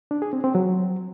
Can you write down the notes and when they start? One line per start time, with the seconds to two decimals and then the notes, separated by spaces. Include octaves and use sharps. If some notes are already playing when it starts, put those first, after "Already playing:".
0.11 D4
0.22 G#4
0.33 C4
0.44 C4
0.55 F#3